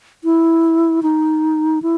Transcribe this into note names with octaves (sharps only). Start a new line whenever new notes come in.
E4
D#4
E4